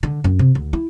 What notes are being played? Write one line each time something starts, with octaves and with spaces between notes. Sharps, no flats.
D3
F#2
C3
D2
E4